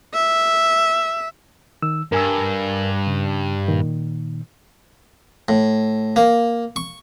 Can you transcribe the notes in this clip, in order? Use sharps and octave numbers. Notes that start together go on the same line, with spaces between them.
E5
D#3 E6
G2 A#4 G#5 E6
C#3
A#2 D#3
A2
A#3
C#6